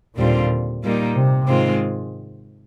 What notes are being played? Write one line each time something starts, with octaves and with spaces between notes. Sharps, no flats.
D#2 A#2 D3 G3 C4 F4
A#2 G3 A#3 D#4
C3
G#2 D#3 G#3 C4 F4